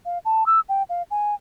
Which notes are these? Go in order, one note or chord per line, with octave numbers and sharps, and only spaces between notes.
F5
A5
E6
G5
F5
G#5